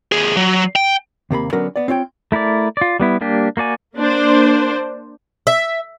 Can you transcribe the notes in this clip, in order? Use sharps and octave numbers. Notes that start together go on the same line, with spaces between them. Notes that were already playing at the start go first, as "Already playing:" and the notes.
D#2 G#4
F#3
G5
D#2 C3 A#3 B5
D3 F#3 B3 C#4 A#4
B3 D5
C4 F4 C#5 G5
A3 E4 A#4 D5
F4 D5
G3 B3 E4
G3 A#3 D4 G4
A#3 F#4 D5 G#5
A#3 D4 C5
E5